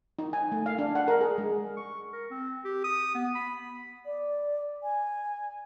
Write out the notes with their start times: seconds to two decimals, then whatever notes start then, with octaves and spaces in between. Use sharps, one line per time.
0.19 D#4
0.33 G#5
0.52 A3
0.66 F5
0.79 D4
0.95 F#5
1.08 A#4
1.21 G#4
1.38 G#3
1.77 C#6
2.13 A#4
2.31 C4
2.64 G4
2.84 D#6
3.15 B3
3.35 B5
4.06 D5
4.83 G#5